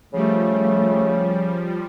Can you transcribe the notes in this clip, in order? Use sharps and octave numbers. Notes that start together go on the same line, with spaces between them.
C#3 F3 G3 A3